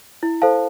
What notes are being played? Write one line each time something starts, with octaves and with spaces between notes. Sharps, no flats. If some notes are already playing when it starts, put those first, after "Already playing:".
E4
A4 C5 F5 A5